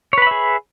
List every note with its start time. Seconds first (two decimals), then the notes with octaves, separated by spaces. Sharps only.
0.13 C#5
0.18 B4
0.22 B5
0.27 E5
0.31 G#4